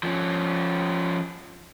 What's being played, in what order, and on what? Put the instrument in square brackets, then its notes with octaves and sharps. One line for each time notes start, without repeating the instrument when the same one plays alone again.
[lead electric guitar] F3 C#4